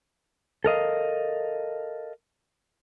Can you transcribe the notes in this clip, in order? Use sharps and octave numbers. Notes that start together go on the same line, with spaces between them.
A4 A#4 D#5 F5